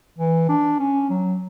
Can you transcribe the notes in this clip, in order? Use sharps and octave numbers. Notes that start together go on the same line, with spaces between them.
E3
D4
C#4
F#3